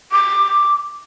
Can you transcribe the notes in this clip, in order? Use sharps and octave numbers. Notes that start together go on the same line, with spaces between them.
D6